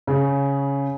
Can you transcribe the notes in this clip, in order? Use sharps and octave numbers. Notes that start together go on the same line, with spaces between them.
C#3